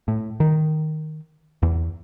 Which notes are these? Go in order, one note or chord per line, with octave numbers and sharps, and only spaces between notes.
A2
D#3
E2